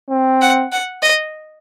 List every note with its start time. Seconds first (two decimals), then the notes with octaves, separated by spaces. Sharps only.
0.10 C4
0.42 F#5
0.72 F#5
1.02 D#5